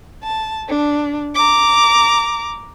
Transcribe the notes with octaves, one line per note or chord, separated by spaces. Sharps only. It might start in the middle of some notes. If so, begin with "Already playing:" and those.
A5
D4
A#5 D6